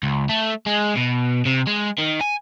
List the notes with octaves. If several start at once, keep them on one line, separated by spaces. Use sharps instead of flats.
C#2
A3
G#3
B2
C3
G#3
D#3
G#5